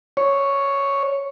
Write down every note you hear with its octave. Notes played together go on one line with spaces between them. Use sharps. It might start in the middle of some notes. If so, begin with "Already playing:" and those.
C#5